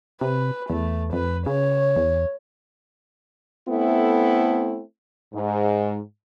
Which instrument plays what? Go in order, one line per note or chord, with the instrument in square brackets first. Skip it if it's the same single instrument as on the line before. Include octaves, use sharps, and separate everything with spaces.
[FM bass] C3 [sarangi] B4
[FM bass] E2 [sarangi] A3
[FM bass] F2 [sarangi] B4
[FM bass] C#3 [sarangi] C#5
[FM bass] E2
[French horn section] A3 B3 C4 E4 A4
G#2